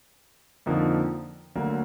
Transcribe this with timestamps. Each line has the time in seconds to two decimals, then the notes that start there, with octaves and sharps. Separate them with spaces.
0.66 F2 D3 F3 A#3 D#4
1.55 D2 D3 F#3 A#3